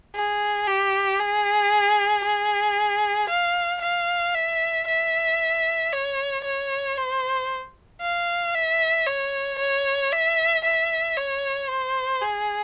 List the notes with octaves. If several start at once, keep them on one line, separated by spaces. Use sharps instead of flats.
G#4
G4
G#4
G#4
F5
F5
E5
E5
C#5
C#5
C5
F5
E5
C#5
C#5
E5
E5
C#5
C5
G#4